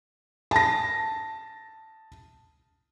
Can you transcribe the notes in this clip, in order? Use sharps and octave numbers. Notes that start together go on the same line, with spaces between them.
A5 A#6